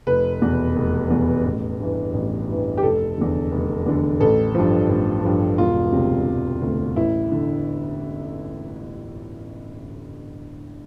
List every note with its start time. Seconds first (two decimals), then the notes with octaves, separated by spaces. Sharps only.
0.07 F1 B4
0.42 E2 B2
0.76 F1
1.10 E2 B2
1.45 A1
1.80 G2 E3
2.14 A1
2.49 G2 E3
2.77 G4
2.83 F1 A4
3.18 E2 D3
3.51 F1
3.86 E2 D3
4.20 A1 A4
4.55 G2 F3
4.90 A1
5.24 G2 F3
5.58 E1 F4
5.93 D2 C3
6.27 E1
6.61 D2 C3
6.96 A1 E4
7.32 D3